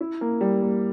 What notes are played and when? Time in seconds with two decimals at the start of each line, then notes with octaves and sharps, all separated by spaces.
0.01 E4
0.21 A#3
0.41 G3
0.62 A#3